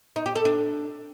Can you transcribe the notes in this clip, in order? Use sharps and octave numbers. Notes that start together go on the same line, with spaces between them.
D#4
G4
A4
D4